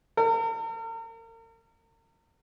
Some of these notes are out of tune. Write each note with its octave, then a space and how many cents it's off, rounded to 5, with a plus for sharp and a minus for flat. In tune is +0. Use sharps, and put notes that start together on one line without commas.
A#4 -40